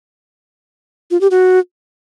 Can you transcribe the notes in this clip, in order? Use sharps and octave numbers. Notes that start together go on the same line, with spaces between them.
F4
G4
F#4